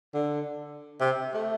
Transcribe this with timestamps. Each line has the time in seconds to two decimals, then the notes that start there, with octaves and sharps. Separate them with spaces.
0.14 D3
1.00 C3
1.34 A3